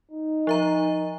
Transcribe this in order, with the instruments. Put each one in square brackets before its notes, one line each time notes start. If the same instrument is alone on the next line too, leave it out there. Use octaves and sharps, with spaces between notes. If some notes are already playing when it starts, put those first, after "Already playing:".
[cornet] D#4
[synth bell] F3 E5 A#5